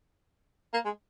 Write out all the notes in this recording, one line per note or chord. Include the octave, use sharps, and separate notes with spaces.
A#3
G#3